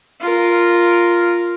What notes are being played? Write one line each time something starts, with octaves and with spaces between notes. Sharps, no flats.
F4 A#4